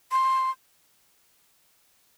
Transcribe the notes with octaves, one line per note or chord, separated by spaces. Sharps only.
C6